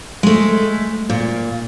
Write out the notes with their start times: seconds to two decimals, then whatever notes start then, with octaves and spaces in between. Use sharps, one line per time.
0.23 G#3 A3
1.10 A#2